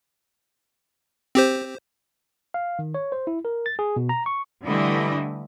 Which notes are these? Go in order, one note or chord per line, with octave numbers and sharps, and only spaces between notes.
C4 G4 C5
F5
D#3
C#5
C5
E4
A#4
A6
G#4
B2
A#5
C#6
D3 E3 G3 A3 E4 D#5